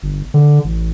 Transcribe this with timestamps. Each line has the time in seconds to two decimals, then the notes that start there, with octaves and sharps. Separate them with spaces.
0.03 G1
0.34 D3
0.64 A1